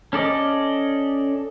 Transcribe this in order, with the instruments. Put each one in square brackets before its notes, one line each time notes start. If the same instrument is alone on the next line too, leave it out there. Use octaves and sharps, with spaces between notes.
[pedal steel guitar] C#4 A4 D5 D#5